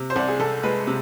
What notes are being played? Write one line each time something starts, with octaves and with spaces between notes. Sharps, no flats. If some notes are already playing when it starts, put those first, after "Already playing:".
Already playing: C3
C5
C2 D5
G#4
C2 A4
G#3 B4
C3